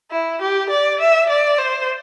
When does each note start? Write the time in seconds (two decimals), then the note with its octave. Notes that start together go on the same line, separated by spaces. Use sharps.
0.11 E4
0.42 G4
0.70 D5
1.01 E5
1.29 D5
1.59 C5